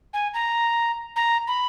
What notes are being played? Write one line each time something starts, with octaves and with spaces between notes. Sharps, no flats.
G#5
A#5
A#5
B5